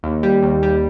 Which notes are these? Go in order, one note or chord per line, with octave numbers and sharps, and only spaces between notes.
D#2
G3
D#2
G3